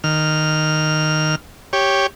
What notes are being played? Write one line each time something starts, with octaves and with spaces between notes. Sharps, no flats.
D#3 F6
G4 C#5